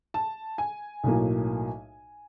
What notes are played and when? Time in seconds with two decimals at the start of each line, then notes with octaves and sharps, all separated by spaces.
0.14 A5
0.58 G#5
1.04 B1 A2 F#3 A#3